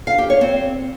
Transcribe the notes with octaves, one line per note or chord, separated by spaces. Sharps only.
F5
G4
C#5
C4